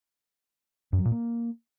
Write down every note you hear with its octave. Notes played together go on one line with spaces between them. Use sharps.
F#2
F#3
A#2
A#3